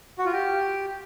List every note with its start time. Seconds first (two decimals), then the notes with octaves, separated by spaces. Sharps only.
0.18 F#4
0.25 F4
0.32 G4